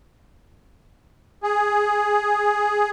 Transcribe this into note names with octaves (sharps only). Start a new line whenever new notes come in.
G#4